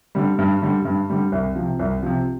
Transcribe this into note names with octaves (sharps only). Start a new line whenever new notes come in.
D3 G3
G2
D3 G3
G2
D3 G3
C2
C3 F3
C2
C3 F3